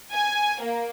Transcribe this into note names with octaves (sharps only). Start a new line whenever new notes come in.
G#5
A#3